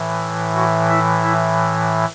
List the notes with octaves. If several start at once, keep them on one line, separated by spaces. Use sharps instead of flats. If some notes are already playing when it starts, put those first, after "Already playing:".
Already playing: A2 E3
F#4
E4
E4